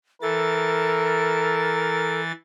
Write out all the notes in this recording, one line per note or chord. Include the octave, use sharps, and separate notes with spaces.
E3 A4 A#4 A6